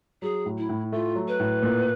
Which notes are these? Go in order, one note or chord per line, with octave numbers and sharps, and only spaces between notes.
F#3 G#4
A2
E4
A2
A3 F4
F#3
B4
A2
A#2